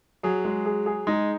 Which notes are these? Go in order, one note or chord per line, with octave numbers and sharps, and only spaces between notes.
F#3 G#4
G#3
G#4
G#4
G#3 D#4